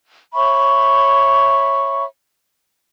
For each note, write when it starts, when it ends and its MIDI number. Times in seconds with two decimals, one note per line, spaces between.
0.34 2.04 73
0.34 2.04 76
0.34 2.04 83
0.34 2.04 85